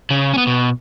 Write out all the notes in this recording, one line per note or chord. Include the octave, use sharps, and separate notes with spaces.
C#3
B3 C#4
B2